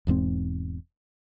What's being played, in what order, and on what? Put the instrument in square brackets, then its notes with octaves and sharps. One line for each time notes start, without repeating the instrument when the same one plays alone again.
[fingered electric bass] E1 E2 G#2 C4